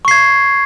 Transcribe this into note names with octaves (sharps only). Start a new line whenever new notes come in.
C#6 G#6 C7